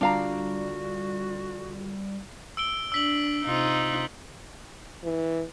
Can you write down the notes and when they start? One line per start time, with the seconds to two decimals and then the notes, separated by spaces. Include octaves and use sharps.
0.01 D3 G3 D4 F4 F#4 D5 F5 A#5
2.57 E6 D7 G7
2.92 D4 E6 B6 F#7
3.43 C3 D#4 F4
5.04 E3